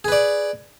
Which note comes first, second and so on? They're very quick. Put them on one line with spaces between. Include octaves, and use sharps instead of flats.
G#4 B4 D5